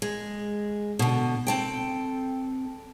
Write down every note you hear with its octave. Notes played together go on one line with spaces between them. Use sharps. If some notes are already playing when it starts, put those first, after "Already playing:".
G#3
B2 D3
C4 A4 G5